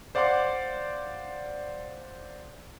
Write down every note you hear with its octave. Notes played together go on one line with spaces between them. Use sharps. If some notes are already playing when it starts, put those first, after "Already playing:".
C5 D5 F5 F#5 C6 D6